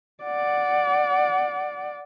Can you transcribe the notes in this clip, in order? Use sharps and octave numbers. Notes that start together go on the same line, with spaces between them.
D5 F#5